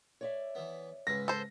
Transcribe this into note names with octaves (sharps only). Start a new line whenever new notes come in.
C#5 D5 E5
E3 B3
C#2 G#2 B4 A#6
A4 C5